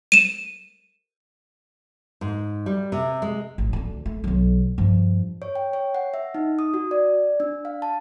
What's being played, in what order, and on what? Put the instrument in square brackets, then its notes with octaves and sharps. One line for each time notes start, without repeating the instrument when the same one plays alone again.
[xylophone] D#7 E7
[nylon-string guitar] G#2
G3
C3
G#3
[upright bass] A1
D2 D3
A3
B1 F#3
G2 F3
[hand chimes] C#5
G5
C#5
F#5
E5
D#4
D#6
F#4
D5
D4
F5
A5